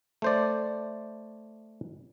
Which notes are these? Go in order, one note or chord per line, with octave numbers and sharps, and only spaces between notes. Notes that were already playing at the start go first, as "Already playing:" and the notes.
A3 C5 D5